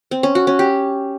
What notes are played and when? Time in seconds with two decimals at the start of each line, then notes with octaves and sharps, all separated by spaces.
0.11 C4
0.23 C#4
0.35 F#4
0.47 C#4
0.59 G4